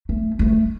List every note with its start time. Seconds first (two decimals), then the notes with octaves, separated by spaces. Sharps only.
0.09 A3
0.39 A3